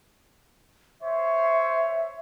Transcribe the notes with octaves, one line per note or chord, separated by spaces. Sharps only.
C5 C#5 E5